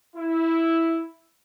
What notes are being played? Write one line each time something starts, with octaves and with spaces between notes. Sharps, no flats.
E4